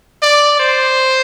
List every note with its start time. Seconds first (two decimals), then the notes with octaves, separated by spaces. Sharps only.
0.23 D5
0.59 C5